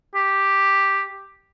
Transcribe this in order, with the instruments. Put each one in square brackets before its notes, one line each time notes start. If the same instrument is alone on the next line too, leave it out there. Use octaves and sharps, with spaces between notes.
[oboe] G4